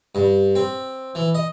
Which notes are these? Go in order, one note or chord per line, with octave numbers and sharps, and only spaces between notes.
G2
C4
E3
D#5